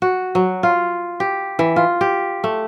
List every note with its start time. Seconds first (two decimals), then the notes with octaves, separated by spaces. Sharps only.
0.02 F#4
0.35 F#3
0.63 F4
1.20 G4
1.59 E3
1.76 F4
2.01 G4
2.44 A3